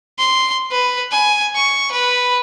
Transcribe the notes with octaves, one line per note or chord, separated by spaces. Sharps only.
C6
B4
G#5
C#6
B4